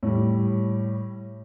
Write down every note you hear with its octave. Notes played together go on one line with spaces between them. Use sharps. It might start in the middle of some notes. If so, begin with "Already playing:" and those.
A2 G3